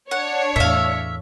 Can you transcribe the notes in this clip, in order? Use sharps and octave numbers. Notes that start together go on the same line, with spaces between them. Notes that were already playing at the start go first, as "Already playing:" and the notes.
D4 C#5 F#5
E2 A2 E5 F5